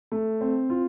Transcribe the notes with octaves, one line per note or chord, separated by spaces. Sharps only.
A3
C4
F4